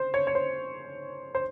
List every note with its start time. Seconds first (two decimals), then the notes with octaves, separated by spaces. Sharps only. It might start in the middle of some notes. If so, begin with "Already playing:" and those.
Already playing: C5
0.14 C#5
0.27 C#5
0.35 C5
1.35 C5